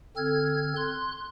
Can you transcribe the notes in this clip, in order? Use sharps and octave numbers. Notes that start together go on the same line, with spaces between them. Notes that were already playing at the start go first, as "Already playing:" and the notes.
D3 C4 A4 F6 G#6
C6 F#6